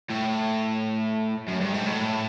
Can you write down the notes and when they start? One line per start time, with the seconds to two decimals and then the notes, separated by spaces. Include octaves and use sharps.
0.10 A2
1.48 F#2
1.61 G2
1.74 G#2
1.86 A2